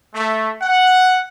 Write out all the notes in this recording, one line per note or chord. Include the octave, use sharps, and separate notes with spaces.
A3
F#5